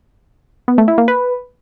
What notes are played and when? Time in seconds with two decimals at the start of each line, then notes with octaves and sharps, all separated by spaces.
0.68 B3
0.78 A3
0.88 E4
0.98 A#3
1.08 B4